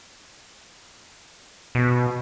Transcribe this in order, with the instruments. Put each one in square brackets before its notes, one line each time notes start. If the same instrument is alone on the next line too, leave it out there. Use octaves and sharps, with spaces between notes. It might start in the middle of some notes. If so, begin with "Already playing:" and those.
[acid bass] B2